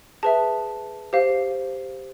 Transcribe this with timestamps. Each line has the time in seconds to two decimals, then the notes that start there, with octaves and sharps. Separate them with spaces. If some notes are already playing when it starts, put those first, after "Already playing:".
0.23 G#4 B4 E5 A5
1.13 G4 C5 F5